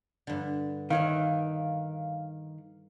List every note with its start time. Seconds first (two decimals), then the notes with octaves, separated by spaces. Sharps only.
0.27 G2 D3
0.90 D#3 B4 C#5 E5 F5